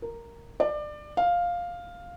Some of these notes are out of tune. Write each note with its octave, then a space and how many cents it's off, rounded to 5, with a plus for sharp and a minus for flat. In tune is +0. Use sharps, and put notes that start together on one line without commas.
A#4 -5
D5 +25
F5 +5